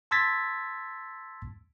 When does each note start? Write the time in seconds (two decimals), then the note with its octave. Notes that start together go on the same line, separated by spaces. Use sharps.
0.11 A5 C6 E6 G#6 A6 B6